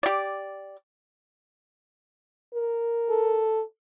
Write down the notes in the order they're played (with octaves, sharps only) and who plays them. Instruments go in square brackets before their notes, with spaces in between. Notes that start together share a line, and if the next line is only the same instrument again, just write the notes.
[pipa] G4 D5
[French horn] A#4
[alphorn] A4